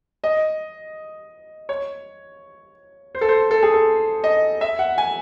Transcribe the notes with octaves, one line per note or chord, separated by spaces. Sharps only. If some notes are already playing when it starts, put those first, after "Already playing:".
D#5
C#5
C5
A4
C5
A4
G#4
A4
D#5
E5
F#5
G#5